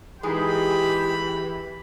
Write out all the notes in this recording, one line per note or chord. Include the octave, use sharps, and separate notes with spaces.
E3 G#3 D#4 G4 G#4 B5